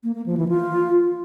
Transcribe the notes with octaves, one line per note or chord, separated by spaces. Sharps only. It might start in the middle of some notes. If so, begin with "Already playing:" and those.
A#3
A#3
F3
E3
F4